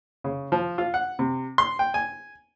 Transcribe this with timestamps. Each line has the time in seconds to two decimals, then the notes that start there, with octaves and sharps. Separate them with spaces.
0.24 C#3
0.52 F3
0.78 F4
0.94 F#5
1.19 C3
1.58 C6
1.79 G5
1.94 G#5